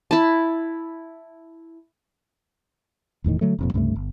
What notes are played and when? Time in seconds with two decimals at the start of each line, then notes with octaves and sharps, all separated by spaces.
0.11 E4 A5
3.24 E1 E2 A2 D#3
3.41 D3 F#3 A3
3.59 F1 F2 A#2
3.74 C#2 G2 C3 A3
3.96 G1